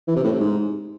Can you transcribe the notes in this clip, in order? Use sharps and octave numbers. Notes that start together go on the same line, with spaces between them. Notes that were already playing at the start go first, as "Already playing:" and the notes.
E3
C3
A2
C3
G#2